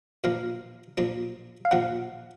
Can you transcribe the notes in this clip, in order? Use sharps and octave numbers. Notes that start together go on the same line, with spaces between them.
A#2 F3 A#3 D4 F5
A#2 F3 A#3 D4
F5
A#2 F3 A#3 D4 F#5